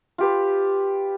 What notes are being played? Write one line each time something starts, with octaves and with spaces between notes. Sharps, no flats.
F4 G4 B4